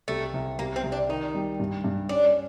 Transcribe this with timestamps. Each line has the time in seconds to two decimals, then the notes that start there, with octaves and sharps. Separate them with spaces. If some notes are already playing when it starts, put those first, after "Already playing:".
0.08 C2 A3
0.34 C2
0.59 C2 A#3
0.76 C4
0.84 C2
0.92 D4
1.09 D#3 D#4
1.34 G3
1.60 G2
1.84 G2
2.09 C#4 D4